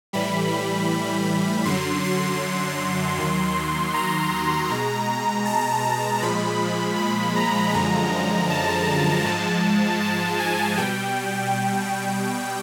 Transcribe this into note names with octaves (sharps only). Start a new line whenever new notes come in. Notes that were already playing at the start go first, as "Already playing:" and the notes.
A2 E3 G3 B5
F#2 D3 F#3 C6
C6
D#2 D#3 F#3
A#5
B2 G#3
A5
A#5
A#2 F3 G#3 B5
B5
A#5
F#2 D3 F3 G#3
A5
G#2 F3 G#3
A5
G#5
B2 G3 G5